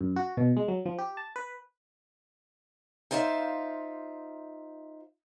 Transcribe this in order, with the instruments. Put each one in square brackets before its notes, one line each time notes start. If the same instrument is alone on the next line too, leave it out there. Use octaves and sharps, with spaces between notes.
[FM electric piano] F#2
F#4
B2
G#3
F#3
F3
G4
A5
B4
[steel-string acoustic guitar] D#4 F4 C5 D5 E5 F5